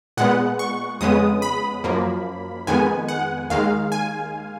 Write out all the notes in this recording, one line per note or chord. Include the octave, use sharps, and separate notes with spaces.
A#2 G#3 B3 F#5
C#6
F2 C#3 G#3 B3 D#6
B5
F#2 F3 A#3
F2 D#3 G#3 B3 G#5
F#5
D#2 D#3 G#3 F5
G#5